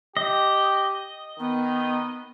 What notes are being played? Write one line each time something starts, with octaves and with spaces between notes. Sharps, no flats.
G4 D#5
D#3 B3